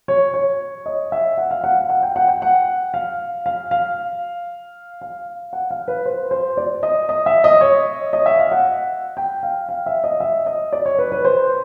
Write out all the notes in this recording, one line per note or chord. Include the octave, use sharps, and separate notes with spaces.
C#5
C#5
D#5
E5
F#5
F5
F#5
F5
F#5
G5
F#5
G5
F#5
F5
F5
F5
F5
F#5
F5
B4
C5
C5
D5
D#5
D#5
E5
D#5
C#5
D#5
E5
F5
F#5
G5
F5
F5
E5
D#5
E5
D#5
D5
C#5
B4
B4
C5